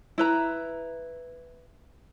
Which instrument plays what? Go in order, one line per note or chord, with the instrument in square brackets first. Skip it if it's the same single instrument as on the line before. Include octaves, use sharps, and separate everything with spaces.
[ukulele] E4 B4 A#5